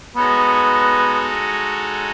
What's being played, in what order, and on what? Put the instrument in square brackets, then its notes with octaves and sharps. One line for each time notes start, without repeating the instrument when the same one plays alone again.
[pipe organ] G#3 D#4 F#4 A4 C#5 [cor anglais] B3